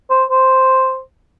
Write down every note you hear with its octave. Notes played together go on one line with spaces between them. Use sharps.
C5
C5